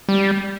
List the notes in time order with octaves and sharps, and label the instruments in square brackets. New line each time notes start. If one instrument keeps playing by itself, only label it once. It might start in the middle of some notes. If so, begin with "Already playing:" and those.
[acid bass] G3